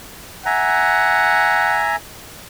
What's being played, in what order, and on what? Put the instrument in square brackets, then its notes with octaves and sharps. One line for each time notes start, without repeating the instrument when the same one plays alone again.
[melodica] E5 G#5 A#5 [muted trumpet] F#5